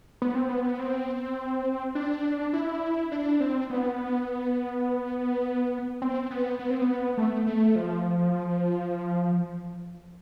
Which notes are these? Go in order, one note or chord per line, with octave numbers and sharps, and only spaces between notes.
B3
C4
B3
C4
D4
E4
D4
C4
B3
C4
B3
B3
C4
B3
A3
A3
F3